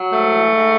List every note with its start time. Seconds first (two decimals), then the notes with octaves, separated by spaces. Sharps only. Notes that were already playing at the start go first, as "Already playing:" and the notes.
Already playing: F#3
0.11 G#2 A3
0.30 E3
0.51 G#2